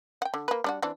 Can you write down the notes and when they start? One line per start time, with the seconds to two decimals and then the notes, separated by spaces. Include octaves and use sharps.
0.22 F#5 G5
0.34 D3
0.48 A#3 B4
0.64 G3 D4 F#4
0.82 E3 C4 D4